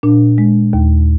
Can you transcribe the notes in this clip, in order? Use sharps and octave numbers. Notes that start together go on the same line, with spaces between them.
A#2 D4
G#3
D#2